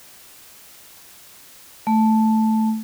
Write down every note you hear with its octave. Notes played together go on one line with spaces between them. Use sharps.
A3